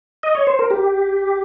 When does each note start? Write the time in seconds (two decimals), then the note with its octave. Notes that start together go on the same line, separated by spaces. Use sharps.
0.23 D#5
0.35 C#5
0.47 C5
0.59 A#4
0.70 G4